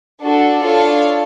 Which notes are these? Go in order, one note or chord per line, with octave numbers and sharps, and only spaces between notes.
D4 F#4 A4
D4 F4 A4 C#5 F5